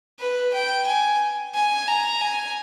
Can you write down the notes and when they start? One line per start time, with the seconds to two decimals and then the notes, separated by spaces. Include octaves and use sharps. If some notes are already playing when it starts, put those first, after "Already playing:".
0.19 B4
0.53 G5
0.87 G#5
1.54 G#5
1.88 A#5
2.21 G#5